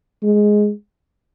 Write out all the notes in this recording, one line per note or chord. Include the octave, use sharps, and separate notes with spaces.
G#3